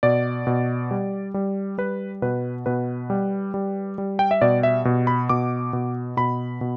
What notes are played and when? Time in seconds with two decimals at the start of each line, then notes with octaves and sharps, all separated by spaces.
0.03 B2 D5
0.47 B2
0.91 G3
1.34 G3
1.78 G3 B4
2.22 B2 B4
2.66 B2 B4
3.10 G3
3.54 G3
3.98 G3
4.19 G5
4.31 E5
4.41 B2 D5
4.63 E5
4.85 B2
5.07 B5
5.29 B2 D6
5.73 B2
6.17 B2 B5
6.61 B2